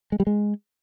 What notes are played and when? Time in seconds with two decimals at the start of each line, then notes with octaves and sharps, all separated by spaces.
0.12 G#3
0.20 G3
0.27 G#3